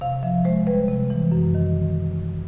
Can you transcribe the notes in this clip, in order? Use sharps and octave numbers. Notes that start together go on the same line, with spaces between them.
C3 F5
F3 E5
G#3 C5
G3 B4
C3
E3
F#2
D#3